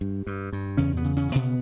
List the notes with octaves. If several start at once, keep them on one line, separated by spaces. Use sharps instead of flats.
G2
G2
G2
E2 C#3 C#4
B2 B3
C#3
C#3 C#4
C#3
B2 B3